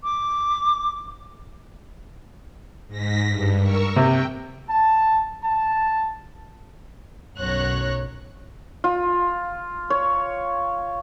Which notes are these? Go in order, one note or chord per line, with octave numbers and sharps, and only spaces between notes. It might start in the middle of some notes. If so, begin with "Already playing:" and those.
D6
G#2 A#6 B6
G2
A#4 C#6 E6
C3 G5
A5
A5
B1 F#2 F#3 C#5 F#6 A#6
F4
C#5